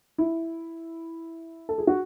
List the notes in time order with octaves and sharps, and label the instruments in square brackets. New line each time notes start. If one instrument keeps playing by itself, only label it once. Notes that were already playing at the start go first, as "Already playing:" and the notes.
[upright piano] E4
A4
G#4
F#4